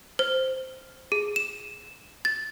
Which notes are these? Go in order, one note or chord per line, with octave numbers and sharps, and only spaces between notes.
C5
G#4
E7
A6